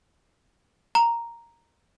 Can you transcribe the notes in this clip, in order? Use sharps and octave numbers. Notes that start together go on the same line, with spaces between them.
A#5